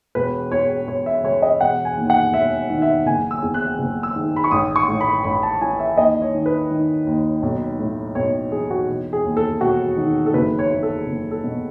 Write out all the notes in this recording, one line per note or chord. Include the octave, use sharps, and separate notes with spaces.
E1 B4
E2 C#5
E1 C#5
E5
C#3 C#5
D#5
E1 F#5
G#5
D#2
F#5
E1 E5
D#3
E5
F#1 G#5
E6
E2
F#6
F#1
E6
D#3
B5
C#6
A1 D#6
C#6
A2
B5
A1 B5
A5
E3 G#5
E5
D#2 D#5
C#5
D#3
B4
D#3
D#2
B1
A2
B1 C#5
E3 G#4
F#4
E1
G#4
D#2
A4
E1 F#4
D#3
A4
F#1 B4
C#5
E2
A4
F#1
A4
B2